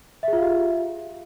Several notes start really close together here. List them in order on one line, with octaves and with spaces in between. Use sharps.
E5 G#4 F4 F5 G4